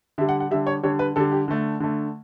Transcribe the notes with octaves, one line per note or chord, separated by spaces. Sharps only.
D3 G3 E5
F#5
F#5
D3 G3 E5
C#5
D3 G3 C#5
B4
D3 G3 A4
G4
D3 A3
D3 A3